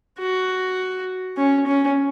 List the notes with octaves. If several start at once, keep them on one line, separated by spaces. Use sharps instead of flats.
F#4
C#4
C#4